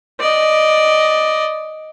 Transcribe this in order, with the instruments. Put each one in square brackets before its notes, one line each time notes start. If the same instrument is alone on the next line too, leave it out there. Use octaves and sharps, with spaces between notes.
[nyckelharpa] D5 D#5